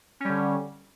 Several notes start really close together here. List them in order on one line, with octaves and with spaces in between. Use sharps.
C#4 G3 D3